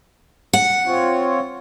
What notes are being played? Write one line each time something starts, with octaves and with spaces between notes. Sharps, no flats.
F#5
C4 F4 C#5